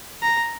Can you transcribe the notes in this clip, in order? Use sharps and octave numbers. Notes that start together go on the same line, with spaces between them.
A#5